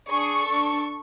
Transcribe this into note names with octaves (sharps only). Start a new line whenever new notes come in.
D4 G#4 C#6
D4 A4